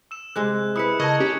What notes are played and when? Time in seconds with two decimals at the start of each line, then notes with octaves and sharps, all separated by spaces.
0.11 E6 E7
0.36 C3 G#3 F#6
0.76 E4 B4 D#6 C#7
1.00 C#3 A#4 D#5 A5 C#6 G#6
1.20 C#4 G4